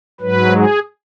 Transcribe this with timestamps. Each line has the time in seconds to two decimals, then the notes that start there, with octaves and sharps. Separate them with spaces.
0.20 G#2 F#3 B4
0.52 G#4